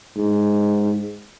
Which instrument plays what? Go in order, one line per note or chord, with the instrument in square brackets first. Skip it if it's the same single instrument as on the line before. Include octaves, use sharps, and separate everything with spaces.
[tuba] G#2